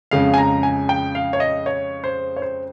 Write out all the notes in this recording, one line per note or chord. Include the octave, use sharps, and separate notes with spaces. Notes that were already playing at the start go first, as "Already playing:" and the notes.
F2 C#3 G#3 F5
G#5
A#5
G#5
G5
F5
C#5
D#5
C#5
C5
C#5
C5